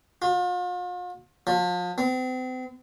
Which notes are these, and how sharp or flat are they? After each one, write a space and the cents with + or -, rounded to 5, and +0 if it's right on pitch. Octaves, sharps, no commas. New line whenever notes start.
F4 +45
F3 +35
C4 -40